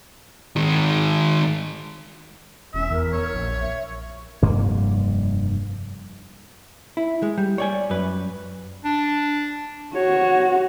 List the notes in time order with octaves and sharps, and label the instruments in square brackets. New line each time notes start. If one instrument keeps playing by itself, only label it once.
[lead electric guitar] D#3 G#3
[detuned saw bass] E1 [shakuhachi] C#4 [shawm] E5
[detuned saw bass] E2 [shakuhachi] A#4
[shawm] C#5
[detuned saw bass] A#1
[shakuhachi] E5
[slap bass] F1 G2 A#3
[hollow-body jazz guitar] E4
G#3
G3
C#5 D5 G#5
F#2 B4
[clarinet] D4
[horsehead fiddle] F#4 [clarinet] C#5